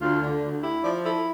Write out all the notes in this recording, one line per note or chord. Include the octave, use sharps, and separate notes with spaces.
D2 F4
D3
D2
E4 G4
F3 D5
E4 A4